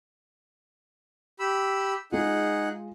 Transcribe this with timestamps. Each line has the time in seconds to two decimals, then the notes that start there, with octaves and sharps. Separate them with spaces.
1.40 G4 B5 E6
2.12 G#3 D#4 F4 G#4 F#5